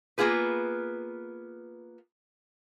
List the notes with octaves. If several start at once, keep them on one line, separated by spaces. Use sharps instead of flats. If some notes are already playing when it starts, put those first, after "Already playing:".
A#3 B3 F4 G#4 B4